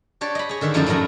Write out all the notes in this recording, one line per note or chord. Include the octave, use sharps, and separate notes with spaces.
D4 G4 C#5 D5
D#5 B5
G#4 C#5
D3 D#3 E5 G5
F#2 F3 A3 D#4 E4 D5
A2 F#3 A3 A#4 F#5